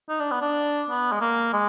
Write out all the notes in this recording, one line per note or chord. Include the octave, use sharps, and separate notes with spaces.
D#4
D4
B3
D4
B3
G#3
A#3
G#3